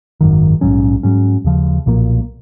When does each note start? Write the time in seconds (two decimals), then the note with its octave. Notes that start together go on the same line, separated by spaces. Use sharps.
0.21 G#1 F#2 D#3
0.61 A#1 G#2 F#3 C#4
1.03 G#2 F#3 C#4
1.44 D#2 C#3 F3
1.86 B1 A#2 F3 A#3